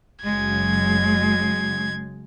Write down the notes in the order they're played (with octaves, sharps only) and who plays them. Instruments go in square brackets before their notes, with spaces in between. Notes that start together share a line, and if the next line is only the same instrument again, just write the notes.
[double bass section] F#1 C#3 F#3 [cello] G#3 [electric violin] G#6